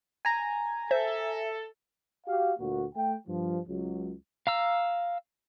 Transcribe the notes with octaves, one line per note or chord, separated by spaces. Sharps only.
G#5 A#5
A4 C5 E5
F#4 G4 F5
D2 A#2 A#3 F#4
A3 G5
G2 F3
C#2 F#3
F5 A#5 E6